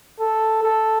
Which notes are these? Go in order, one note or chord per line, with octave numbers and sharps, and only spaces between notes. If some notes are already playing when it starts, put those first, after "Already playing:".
A4
A4